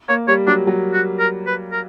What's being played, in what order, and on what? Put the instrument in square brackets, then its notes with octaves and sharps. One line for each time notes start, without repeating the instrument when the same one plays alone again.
[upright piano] A#3 [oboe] C#5
[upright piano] G3 [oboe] C#5
[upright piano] F#3 [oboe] D4
[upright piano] F#3
[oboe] F#4
A#4
B4
A#4